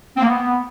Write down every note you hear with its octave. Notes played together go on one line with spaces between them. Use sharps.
C4
A#3
B3